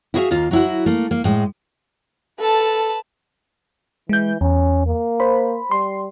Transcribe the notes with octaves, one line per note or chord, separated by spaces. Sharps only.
E4 F#4 G#4 C5 E5 F5
D#2 A#3 F4
F#3 E4 F#4
A3 A#3
A#3
A2 G#3
A4 B4 A5
E3 G#3 G6
E2 C#4
A#3
C5 B5
G3 C6